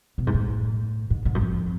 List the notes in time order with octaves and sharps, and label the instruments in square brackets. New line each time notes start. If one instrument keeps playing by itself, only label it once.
[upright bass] B2
G#2
A2
G#2
G#2
F#2
F2